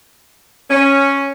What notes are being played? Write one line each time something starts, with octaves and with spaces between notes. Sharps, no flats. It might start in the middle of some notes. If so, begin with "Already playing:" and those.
C#4